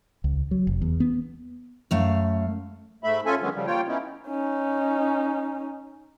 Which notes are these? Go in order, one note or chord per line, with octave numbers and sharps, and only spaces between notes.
C#2
F#3
F1
E2
B3
F#2 A3 F5
G#2 A3 E5 B5
C#4 F4 A4 E5 G#5
D3 D#3 F#3 G#3 B3 C#4
C#3 F3 G3
A#3 F4 C#5 G5
B3 C#4 D#4 E4
C#4 D#4